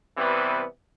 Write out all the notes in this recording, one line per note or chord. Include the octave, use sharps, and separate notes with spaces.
C3 E3 G3 B3